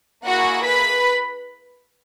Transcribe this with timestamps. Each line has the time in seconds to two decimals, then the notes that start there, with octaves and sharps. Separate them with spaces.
0.25 A#3 E4 F#4 G#4 F#5
0.64 B4 B5